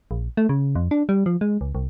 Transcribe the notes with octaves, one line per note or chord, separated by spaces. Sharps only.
A#1
A3
C#3
F2
D4
G3
F3
G#3
C#2
C2